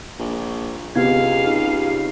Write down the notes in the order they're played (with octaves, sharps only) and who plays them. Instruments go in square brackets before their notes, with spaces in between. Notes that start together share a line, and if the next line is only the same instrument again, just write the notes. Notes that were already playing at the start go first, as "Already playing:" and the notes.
[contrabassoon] A#1
[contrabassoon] C#2 [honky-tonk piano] C3 G#3 B3 [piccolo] F5 [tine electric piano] G#6
[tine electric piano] D#4